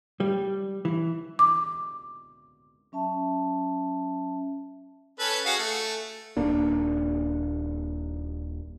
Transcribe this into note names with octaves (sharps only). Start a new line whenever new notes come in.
G3
E3
D6
F#3 C#4 E5 A5
C#4 A4 B4
F#4 G#4 F5
A3
D#1 A#3 D4